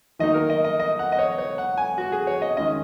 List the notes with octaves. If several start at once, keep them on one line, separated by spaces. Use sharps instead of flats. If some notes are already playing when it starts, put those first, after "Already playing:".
D#3 F#3 A#3 D#4 D#5
A#4
D#5
D#5
D#5
F#5
D#5
C#5
C#5
F#5
G#5
F#4
G#4
C#5
D#5
D#3 G#3 C#4 D#5